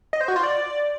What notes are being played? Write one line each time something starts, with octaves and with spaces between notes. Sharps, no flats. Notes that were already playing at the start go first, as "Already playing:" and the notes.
D#5
C5
F#4
F4
D5